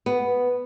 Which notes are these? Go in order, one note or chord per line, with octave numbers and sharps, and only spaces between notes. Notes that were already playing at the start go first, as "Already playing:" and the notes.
B3